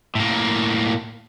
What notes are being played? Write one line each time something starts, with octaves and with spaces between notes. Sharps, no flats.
A2 A#3